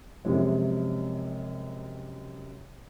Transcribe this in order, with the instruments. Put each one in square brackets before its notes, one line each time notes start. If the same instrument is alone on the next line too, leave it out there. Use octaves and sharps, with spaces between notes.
[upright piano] F#2 C3 F3 G#3